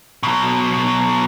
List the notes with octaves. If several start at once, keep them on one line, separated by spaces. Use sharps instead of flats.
B2 F#3